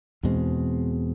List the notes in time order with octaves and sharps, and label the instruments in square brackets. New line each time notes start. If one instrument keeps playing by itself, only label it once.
[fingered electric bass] E2 B2 G#3 C4